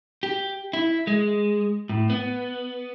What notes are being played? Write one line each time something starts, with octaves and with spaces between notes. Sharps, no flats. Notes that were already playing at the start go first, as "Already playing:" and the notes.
G4
E4
G#3
A2
B3